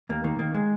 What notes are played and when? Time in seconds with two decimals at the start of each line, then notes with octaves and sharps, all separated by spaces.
0.09 D#2 A#3
0.24 D#3 A#3
0.39 D#3 A#3
0.54 G#3